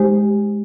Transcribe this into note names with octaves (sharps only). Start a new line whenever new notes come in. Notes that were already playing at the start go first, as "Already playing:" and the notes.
Already playing: G#3 D#4 G4 C5